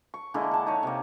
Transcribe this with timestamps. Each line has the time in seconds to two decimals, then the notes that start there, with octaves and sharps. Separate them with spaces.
0.14 C#6
0.34 D3 G#3 A#3 E4
0.51 F#5 A5
0.67 D#4 C#5
0.83 C3 A#3